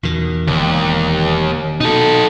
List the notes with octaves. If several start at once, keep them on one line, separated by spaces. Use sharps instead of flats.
E2 B2 D#3
E1 D#2
B2 D#4 A4